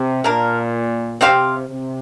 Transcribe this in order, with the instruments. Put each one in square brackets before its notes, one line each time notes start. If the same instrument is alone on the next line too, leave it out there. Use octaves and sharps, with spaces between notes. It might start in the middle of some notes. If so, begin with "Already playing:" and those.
Already playing: [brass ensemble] C3
[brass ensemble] A#2 [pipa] A#3 D4 A#4 F5
[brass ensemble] C3 [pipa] C4 G4 C5 F5
[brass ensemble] C3